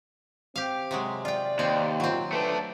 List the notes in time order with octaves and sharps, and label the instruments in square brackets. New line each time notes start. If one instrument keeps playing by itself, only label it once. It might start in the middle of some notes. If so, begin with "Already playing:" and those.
[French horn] C4 [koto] G4 F5
[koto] C3 F#3 G#3
[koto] F4 G5 [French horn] D5
[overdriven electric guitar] D#2 [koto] C4
[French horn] A#2 [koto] F#3 C4
[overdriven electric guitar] A3 D4 [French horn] B4